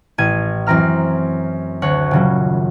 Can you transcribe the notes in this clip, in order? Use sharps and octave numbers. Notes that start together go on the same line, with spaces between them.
A1 G#6 D#7
F#2 E3 C4 A#5 F6
D2 C#5 F#6
D#1 C#3 F#3